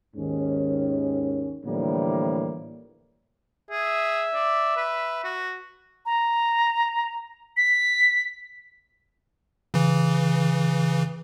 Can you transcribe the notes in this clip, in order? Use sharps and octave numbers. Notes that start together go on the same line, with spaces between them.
D#2 G#2 D#3 C#4
A2 D3 E3 F3 G3 A#3
G#4 E5
D5
B4
F#4
A#5
B6
C#3 E3